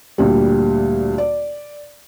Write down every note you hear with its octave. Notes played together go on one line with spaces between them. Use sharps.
D2 A#2 G3
D5